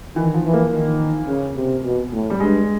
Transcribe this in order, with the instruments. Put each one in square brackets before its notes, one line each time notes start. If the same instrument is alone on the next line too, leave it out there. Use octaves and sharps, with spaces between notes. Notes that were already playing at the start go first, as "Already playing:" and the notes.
[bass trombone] D#3 [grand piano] E3
[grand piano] F3
[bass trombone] E3
[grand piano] A#3
[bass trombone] D#3
C#3
C3
B2
A2
[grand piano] G3
[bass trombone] G2 [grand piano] G#3